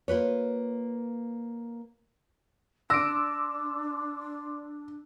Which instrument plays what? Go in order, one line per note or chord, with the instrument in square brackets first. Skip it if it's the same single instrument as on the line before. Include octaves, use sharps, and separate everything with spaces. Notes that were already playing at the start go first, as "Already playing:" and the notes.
[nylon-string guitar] A#3 F4 B4 C#5
[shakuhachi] D4 [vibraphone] D5 C6 D6 [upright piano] E6 [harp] A#6 D7